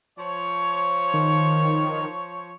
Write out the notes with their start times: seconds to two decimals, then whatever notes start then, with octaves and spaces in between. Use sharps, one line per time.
0.18 F3 C#5
1.14 D#3